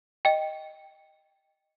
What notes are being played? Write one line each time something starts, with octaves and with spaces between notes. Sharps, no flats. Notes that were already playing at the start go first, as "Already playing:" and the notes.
D#5 G5